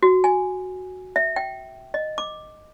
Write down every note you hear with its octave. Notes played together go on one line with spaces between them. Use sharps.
F#4
G#5
E5
G5
D#5
D6